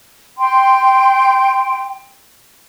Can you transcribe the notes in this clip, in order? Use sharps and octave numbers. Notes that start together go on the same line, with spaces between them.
G5 C6